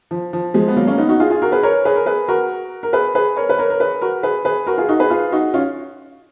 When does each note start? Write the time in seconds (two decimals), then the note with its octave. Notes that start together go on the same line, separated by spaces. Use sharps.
0.11 F3
0.33 F3
0.54 F3 G#3
0.68 B3
0.76 F#3 A#3
0.87 A#3 C#4
0.98 B3 D#4
1.09 D#4 F#4
1.20 F4 G#4
1.30 F4 G#4
1.42 F#4 A#4
1.52 G#4 B4
1.63 A#4 C#5
1.85 G#4 B4
1.96 A#4
2.06 G#4 B4
2.28 F#4 A#4
2.83 A#4
2.93 G#4 B4
3.15 G#4 B4
3.37 A#4 C#5
3.49 B4
3.58 A#4 C#5
3.70 A#4
3.80 G#4 B4
4.01 F#4 A#4
4.23 G#4 B4
4.45 G#4 B4
4.67 F#4 A#4
4.77 F4 G#4
4.89 D#4 F#4
5.00 G#4 B4
5.10 F4 G#4
5.32 D#4 F#4
5.54 C#4 F4